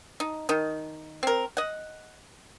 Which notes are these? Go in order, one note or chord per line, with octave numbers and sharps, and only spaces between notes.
D#4
D#3 D#4
C4 A#4
D#5 F#5